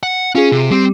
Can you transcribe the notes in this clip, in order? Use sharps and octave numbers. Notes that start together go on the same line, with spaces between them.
F#5
C#4 F4 G#4
C3
G3 C4